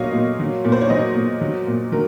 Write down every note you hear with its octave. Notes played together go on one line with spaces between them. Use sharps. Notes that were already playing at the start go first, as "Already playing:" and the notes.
Already playing: A#2 F#3 C#5 D#5 F5
A#2
F#3
A#2
C5
C#5
F#3 C5 D#5
A#2
F#3
A#2
F#3 A#4